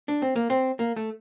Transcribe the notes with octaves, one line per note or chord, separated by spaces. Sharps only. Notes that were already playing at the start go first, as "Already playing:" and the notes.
D4
C4
A#3
C4
A#3
A3